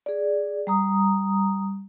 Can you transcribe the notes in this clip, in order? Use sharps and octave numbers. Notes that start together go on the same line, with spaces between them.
G#4 D5
G3 A#5 D#6